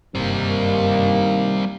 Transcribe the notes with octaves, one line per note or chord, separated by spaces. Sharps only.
F#1 G2 C3 D#3 G3 A#3 C4